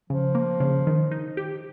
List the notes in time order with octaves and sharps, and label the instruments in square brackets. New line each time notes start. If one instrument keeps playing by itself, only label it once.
[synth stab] C#3 [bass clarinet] F3
[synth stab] A#3
C#3
D#3
D#4
G4